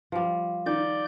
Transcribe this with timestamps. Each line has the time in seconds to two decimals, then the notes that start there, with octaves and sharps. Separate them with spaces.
0.12 F3 G3
0.66 D#3 D5 G6